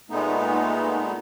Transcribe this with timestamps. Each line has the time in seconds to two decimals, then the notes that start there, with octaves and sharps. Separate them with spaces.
0.10 A#2 G#3 A3 B3 D#4